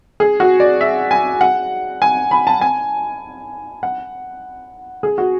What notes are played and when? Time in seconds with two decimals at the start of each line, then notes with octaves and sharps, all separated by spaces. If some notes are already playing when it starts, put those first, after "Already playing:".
0.20 G#4
0.40 F#4
0.60 D5
0.81 E5
1.11 G#5
1.41 F#5
2.02 G#5
2.31 B5
2.47 A5
2.61 G#5
3.83 F#5
5.03 G#4
5.18 F#4